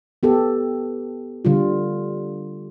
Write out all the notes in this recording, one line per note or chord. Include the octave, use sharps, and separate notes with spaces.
B3 G4 A4
D3 G3 F4